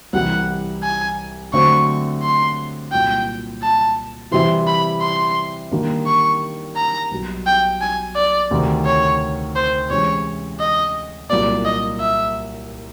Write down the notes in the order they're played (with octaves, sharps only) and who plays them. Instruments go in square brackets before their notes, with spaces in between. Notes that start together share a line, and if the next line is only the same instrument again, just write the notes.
[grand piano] C2 C3 E3 G3 [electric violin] F#5
[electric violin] G#5
[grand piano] D3 F#3 A3 C4 [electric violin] C#6
[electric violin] C6
[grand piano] C2 A#2 F#3 [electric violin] G5
[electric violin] A5
[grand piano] C3 E3 G3 C4 E4 [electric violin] C6
[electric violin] B5
C6
[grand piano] D#3 G3 A#3 D4
[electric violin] C#6
A#5
[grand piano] B1 B2 G3
[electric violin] G5
G#5
D5
[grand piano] D2 C3 D#3
[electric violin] C#5
C5
[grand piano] C3 E3 G#3 C#4 [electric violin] C#5
[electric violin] D#5
[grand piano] C2 A#2 F#3 A#3 [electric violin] D5
[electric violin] D#5
E5